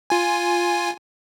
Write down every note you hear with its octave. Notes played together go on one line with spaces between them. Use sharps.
F4 G#5